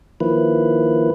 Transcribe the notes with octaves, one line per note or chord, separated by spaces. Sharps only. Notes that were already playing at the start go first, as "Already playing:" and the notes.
D#3 F3 A#3 E4 B4